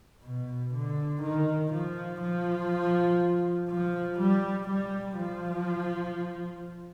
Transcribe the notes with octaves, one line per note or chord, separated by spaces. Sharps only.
B2
D3
D#3
F3
F3
F3
G3
G3
F3